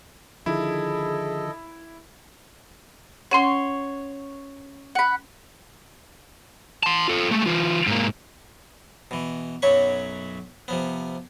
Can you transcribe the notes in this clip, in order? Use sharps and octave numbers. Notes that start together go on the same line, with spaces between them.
D3 D#3 F3 E4 G#4 A4 D#5
C#4 C#5 F#5 C6
F#5 B5
A5 C6
F4 A4
G#3 A3
E3 F4
G#2 A#3
B2 E3
B1 F#2 F#3 C#5 B5 C#6
C3 F3 B3